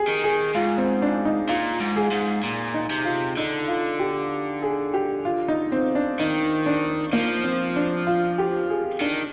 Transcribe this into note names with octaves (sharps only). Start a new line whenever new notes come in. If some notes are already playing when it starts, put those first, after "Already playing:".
Already playing: G4 G#4
D#3
G#4
G#2 F4
C4
D4
D#4
A#2 F4
G#2
G#4
G#2
A#2
D#4
C3
F4
D3 D#4
F4
G4
G#4
G4
F4
D#4
C4
D4
D#3 D#4
D4
F3 A#3
C4
D4
F4
G4
G#4
D#3 D4